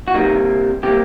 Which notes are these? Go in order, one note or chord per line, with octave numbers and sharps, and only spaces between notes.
F#4
C2 C3 G3 A#3 D#4
C3 G3 A#3 G4